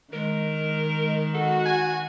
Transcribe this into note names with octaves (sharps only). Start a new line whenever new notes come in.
D#3 G#3 A#4
F#4 A4
G#5